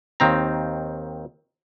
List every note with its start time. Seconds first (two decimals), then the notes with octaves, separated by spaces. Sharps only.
0.20 D#2 D#3 C4 A#5